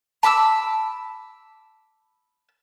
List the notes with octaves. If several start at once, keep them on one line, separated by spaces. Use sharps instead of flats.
A5 B5 D6 E6